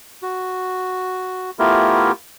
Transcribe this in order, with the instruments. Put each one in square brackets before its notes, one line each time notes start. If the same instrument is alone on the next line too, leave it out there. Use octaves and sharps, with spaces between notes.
[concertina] F#4
A3 B3 E4 F4 G4 A#4